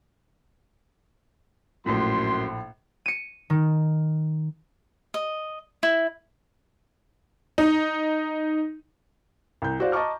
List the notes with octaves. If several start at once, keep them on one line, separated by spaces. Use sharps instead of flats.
A#1 F#2 A2 C6
C#7 D#7
D#3
D#5
E4
D#4
C2 G6
F#4 C5 D5 F5
D#5 A5 A#5 C#6 D6 F6